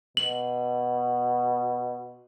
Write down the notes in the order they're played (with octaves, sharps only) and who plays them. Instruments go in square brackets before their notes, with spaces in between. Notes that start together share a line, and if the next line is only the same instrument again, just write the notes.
[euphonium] B2 [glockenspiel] F#7